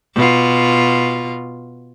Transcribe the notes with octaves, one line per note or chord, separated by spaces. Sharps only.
B2 F4